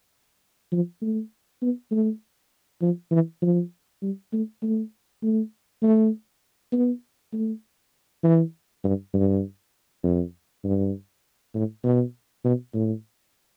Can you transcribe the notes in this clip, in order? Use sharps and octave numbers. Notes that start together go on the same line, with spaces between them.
F3
A3
B3
A3
F3
E3
F3
G3
A3
A3
A3
A3
B3
A3
E3
G2
G2
F2
G2
A2
B2
B2
A2